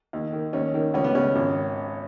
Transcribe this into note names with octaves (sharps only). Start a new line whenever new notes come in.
D#2
D#3
D#2 C#4
D#3
C#2 C#4
B3
C#3 C#4
G#1